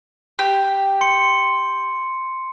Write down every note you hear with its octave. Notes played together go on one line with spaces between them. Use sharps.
G4
C6 C#7